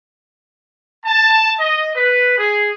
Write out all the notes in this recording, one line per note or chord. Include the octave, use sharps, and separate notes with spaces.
A5
D#5
B4
G#4